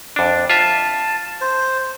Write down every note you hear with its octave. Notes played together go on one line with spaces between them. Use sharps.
F2 D4
F4 E5 A5
C5